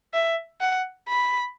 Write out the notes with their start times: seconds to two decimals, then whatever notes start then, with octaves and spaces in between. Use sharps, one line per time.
0.14 E5
0.61 F#5
1.08 B5